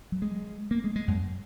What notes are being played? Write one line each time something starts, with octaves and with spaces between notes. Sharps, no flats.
F#3
G#3
A#3
G#3
G#3
F#2